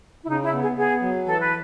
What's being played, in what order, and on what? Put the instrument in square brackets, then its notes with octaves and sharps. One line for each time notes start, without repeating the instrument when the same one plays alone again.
[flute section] E4
[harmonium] C#3 [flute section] D#4
[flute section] E4
[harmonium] B3
[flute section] G#4
[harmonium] B3 [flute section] G#4
[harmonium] F#3
[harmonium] E3 [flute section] A4
[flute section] B4